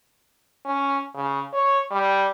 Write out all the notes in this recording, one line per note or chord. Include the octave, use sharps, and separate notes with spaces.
C#4
C#3
C#5
G3